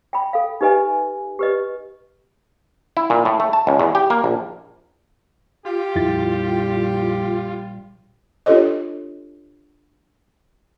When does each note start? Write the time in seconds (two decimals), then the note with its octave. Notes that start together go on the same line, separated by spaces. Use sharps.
0.13 G5 B5
0.33 A4 F5
0.61 D#4 G4 B4 D#5 G#5
1.39 G4 B4 D#5
2.97 E4
3.10 A#2
3.25 A2
3.40 A3
3.53 A5
3.67 C#2
3.79 E2
3.95 G4
4.10 A#3
4.24 A#1
5.65 F4 G4
5.96 A#1 F2 G3 E4 A6
8.46 D4 F4 G4 A4 C#5 D#5